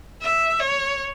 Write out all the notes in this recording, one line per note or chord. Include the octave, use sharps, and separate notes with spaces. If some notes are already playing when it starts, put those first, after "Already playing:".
E5
C#5